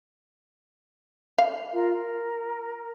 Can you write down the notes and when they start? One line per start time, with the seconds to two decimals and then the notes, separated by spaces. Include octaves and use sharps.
1.38 F5
1.72 F4 A#4
1.93 A#4